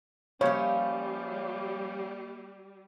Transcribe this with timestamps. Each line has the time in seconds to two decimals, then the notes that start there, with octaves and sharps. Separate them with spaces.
0.41 F3 G3 A#3 C#4 C#5 B5